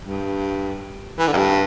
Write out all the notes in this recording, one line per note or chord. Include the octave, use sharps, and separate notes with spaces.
G2
E3
D3
F2
G2